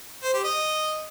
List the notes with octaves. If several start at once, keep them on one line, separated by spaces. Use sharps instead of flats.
C5
G4
D#5